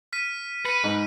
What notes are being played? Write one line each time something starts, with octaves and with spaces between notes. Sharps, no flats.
F6 B6 D#7
B4 C#7 D#7
G#2